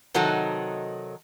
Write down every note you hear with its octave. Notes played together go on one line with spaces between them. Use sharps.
C3 D#3 F#3 D#4 A4